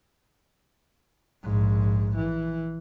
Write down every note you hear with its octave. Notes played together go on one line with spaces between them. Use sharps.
A#1 G#2
E3